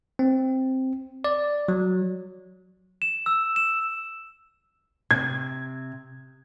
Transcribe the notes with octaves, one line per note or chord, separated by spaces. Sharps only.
C4
D5
F#3
E7
E6
E7
C3 G#6